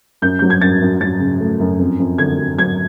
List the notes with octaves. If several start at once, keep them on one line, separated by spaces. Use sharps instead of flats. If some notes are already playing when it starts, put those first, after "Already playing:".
F#2 G6
F#3 G6
G#6
F#2 A6
F#2
F#3 A6
C#3
A3
F#2
F2
F2
D3 G#6
F#3
F#3 G#6